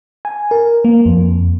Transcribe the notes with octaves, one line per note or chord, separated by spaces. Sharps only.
G#5
A#4
A#3
F2